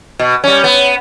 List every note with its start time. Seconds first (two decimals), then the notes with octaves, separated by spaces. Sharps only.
0.19 B2
0.44 G3 C#4
0.64 B3